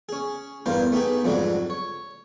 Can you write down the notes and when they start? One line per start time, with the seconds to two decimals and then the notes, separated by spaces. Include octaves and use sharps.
0.09 C#4 G#4
0.66 E2 G2 G3 A#4 C5 F5
0.92 A3 B3 D#4 G4 G#4
1.24 F2 G#2 D3 F#3 G3
1.70 C#5